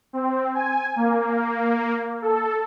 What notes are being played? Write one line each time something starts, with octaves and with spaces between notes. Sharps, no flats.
C4
G#5
A#3
A4